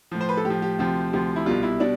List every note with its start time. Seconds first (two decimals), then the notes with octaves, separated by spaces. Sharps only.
0.12 A2 F3
0.21 C5
0.29 B4
0.37 A4
0.45 A2 G4
0.50 F3
0.62 G4
0.79 D2 C3 F3 G4
1.13 D2 C3 F3
1.36 E4
1.46 C2 B2 G3 F4
1.63 E4
1.80 B2 G3 D4